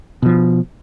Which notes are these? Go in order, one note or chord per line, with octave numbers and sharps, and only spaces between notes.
B2 F3